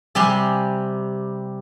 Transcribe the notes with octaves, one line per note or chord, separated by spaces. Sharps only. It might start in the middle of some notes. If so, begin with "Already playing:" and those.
C3 G3 G4 G#5 C6